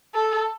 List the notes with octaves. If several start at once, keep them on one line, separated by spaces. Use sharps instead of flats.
A4